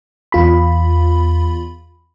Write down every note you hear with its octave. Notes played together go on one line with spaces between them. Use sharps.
E2 F4 B5